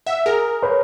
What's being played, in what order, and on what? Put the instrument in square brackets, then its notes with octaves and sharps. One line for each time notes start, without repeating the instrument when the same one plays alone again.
[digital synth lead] E5 [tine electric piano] F#5
[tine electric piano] G#4 [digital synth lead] A#4
[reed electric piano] B4 C#5